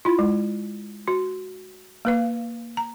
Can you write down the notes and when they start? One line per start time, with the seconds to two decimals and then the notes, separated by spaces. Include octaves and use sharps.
0.05 E4 F4
0.19 G#3
1.08 F#4
2.05 A#3 B4 F5
2.77 A#5